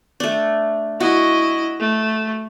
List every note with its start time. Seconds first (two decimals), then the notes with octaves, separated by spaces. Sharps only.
0.20 A3 D4
1.00 E4 F#4 D#5
1.80 A3